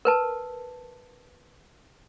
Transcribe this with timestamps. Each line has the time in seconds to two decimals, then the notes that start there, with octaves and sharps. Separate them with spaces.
0.05 A#4 B4 A5